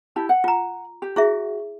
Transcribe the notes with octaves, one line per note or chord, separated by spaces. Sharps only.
E4 G4 A5
F#5
F4 A#5
G4
E4 F#4 G#4 E5